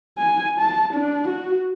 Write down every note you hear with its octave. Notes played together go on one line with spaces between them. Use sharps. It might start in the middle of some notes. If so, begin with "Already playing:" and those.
G#5
A5
D4
F#4